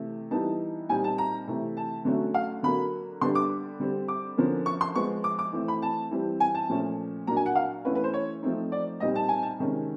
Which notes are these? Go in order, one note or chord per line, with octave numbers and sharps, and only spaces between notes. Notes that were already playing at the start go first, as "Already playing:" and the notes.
Already playing: C3 E3 A3
E3 G3 B3 D#4 A5
A#2 G3 C4 D#4 G#5
A5
A#5
C3 E3 A3
A5
D3 F#3 A3 C#4
F5
D3 F#3 A#3 B5
D3 G3 B3 D4 C6
D6
D3 G3 C4
D6
D3 F3 A#3 C#4
C#6
C6
F3 G#3 B3 C#6
D6
D6
E3 A3 C4
B5
A5
E3 G3 C4
G#5
A5
A#2 F3 A3 C#4
A#2 F#3 A#3 D4 A#5
G#5
F#5
F5
E3 A3 C#4 B4
B4
C5
C#5
F3 A3 C4 D#4
D5
A#2 G3 C4 D#4 D#5
A5
G#5
A5
C3 D#3 G#3 C#4